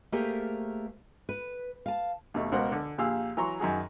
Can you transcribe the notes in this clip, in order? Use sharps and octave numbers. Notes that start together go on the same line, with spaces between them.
A3 A#3 G4 G#4 A#4 C5
B4
F5 A5
D#2 B2 A3
C#2 B2 A#4 C5 F#5
D3
A#1 A#2 G4 G#4 F5 E6
E3 F#3 A#5 C6 C#6
F#2 D#3 F#4 G#4